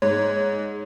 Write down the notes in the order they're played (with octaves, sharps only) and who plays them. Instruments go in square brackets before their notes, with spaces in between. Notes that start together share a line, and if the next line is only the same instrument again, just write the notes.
[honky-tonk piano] G#2 [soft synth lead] C#5